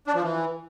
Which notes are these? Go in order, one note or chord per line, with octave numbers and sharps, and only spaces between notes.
D4
F3
E3